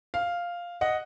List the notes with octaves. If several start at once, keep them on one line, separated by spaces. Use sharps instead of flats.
F5
D#5 F#5